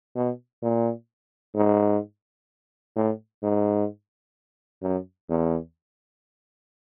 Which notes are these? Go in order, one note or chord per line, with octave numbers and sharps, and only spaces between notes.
B2
A#2
G#2
A2
G#2
F#2
E2